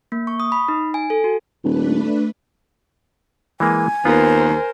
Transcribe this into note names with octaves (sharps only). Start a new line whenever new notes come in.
A#3
C#6
D#6
B5
D#4
G#5
A4
F#4
D#1 A3 D4 B4
E3 G#3 A#3 G#5
D#2 B3 F4 A#4 C5